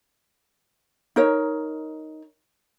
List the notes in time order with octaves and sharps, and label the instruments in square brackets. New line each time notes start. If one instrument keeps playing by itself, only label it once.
[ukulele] D#4 A#4 C#5